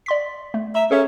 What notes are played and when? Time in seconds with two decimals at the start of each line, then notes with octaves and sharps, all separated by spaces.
0.06 D5 C6 B6
0.54 A3
0.75 E5 A#5
0.91 C#4 G#4 A4 E5